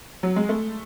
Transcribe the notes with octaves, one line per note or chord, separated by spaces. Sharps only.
F#3
G#3
A3